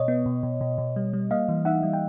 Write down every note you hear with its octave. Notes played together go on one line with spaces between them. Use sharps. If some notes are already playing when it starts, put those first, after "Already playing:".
Already playing: B2 C#5 D#5
B3
B2
B2
B2
B2
G3
G3
A#3 D#5 F5
E3
D#4 E5 F#5
G3
G5